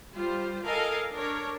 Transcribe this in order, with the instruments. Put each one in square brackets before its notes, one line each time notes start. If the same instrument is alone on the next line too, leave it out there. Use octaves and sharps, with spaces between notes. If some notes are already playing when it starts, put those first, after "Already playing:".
[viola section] G3 F4 C5
A4 A#4 D#5 F5 G#5
D4 A#4 C#5